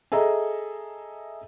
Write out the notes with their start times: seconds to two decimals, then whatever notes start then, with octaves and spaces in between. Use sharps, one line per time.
0.12 G#4 A4 D#5 E5 A#5